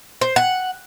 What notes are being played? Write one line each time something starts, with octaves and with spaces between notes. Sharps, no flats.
C5
F#5